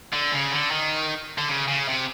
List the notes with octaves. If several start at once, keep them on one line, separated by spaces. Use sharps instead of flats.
D3
C#3
D3
D#3
D3
C#3
C#3
C3